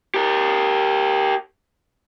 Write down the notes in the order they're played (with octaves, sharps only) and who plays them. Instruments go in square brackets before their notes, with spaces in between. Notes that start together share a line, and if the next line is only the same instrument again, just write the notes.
[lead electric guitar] G4 A#4